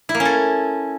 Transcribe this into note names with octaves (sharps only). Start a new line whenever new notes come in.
E4
A#3
C#4
A4